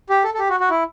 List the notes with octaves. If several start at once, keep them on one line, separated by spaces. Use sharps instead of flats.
G4
A4
A4
G4
F#4
F#4
E4